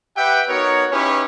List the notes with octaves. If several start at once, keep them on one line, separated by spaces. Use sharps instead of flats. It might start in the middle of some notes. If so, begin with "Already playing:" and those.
G4 B4 E5 F#5 G5
B3 D#4 F#4 A#4 C#5
C#4 D#4 E4 G4 B4 C#5